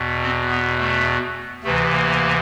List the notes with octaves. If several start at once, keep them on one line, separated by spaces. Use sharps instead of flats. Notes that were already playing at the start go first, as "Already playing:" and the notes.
Already playing: E2 B2
C4
B3
A3
D2 C3 E3 A3
A#3